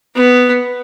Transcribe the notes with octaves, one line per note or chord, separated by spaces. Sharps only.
B3